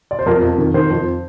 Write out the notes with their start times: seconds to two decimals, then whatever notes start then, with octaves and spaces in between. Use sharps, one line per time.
0.11 D5
0.19 C5
0.26 F2 A#4
0.43 F2
0.58 D#3
0.74 D#3 C5
0.90 F2